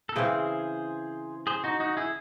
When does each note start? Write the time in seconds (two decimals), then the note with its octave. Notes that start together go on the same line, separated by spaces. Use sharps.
0.09 A4
0.16 C#3 E3 C4 G#4 C5
1.47 G#4 C5
1.64 D#4 F#4
1.80 D#4 F#4
1.97 E4 G#4